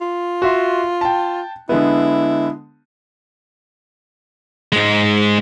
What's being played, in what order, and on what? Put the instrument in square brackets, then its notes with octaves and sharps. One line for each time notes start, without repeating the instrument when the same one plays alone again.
[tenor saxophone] F4
[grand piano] F#4 E5 C6
G5 A5
[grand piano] D3 G#3 B3 [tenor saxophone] E4
[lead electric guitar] G#2 G#3